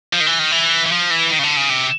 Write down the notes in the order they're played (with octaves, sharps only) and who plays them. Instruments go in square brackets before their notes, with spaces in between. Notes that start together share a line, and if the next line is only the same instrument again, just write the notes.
[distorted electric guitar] F3
D#3
E3
D#3
E3
E3
F3
E3
D#3
C#3
D3
C#3
C3